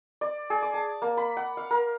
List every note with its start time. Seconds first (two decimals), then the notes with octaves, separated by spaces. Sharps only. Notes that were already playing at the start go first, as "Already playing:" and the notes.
0.21 D5
0.50 G#4
0.62 D6
0.74 A5
1.02 A#3
1.17 B5
1.37 F#5
1.57 F5
1.71 A#4